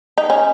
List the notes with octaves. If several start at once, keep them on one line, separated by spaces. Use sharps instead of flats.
D#4
C#4